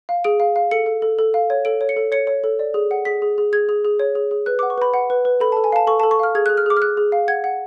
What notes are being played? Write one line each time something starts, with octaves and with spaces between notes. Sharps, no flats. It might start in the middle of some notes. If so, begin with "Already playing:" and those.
F5
G#4 D7
F5
F5
A4 C#7
A4
A4
A4
F5
C#5
A4 D7
C#5
C#7
A4
C#5 C#7
C#5
A4
D5
G#4
F#5
G#4 B6
G#4
G#4
G#4 G#6
G#4
G#4
C#5
G#4
G#4
B4 F#6
D6
F#5
C#6
B4 B5
F#5
B4
B4
A4 B5
A5
A4
G#5
F5 A5
A4 C#6
A5
A4
C#6
F5 F6
G#4 G#6
F#6
G#4
F6
G#4 D6
F6
G#4 F#6
G#4
F5
F#5 G#6
F#5